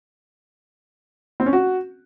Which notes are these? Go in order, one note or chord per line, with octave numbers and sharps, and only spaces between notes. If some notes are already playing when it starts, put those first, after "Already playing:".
C4
C#4
F#4